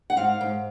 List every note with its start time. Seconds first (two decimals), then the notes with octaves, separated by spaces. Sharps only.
0.10 F#5
0.17 G#2 F5
0.41 G#2